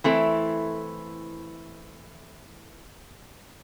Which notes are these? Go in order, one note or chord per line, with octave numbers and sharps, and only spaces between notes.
E3 A3 C4 E4 A4